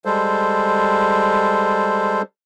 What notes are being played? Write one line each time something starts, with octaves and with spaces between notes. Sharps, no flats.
G3 G#3 A4 C5